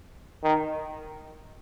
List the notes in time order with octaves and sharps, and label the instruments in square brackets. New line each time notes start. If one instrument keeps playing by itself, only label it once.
[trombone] D#3